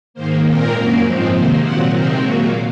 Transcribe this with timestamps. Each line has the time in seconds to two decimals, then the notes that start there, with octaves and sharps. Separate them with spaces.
0.14 G#2 D#3 A#3 C5
0.44 A#2 G#3 C4 A#4
0.74 F#2 C#3 F#3 A#3
1.03 G#2 F3 G#3 C4
1.33 C3 D#3 A#3 C5
1.62 A#2 F#3 C4 F#5
1.91 C3 D#3 G#3 C4 A#4
2.21 A#2 F#3 A#3 F#4